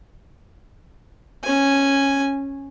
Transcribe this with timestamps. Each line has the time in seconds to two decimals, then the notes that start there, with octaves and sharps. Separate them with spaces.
1.44 C#4 G#5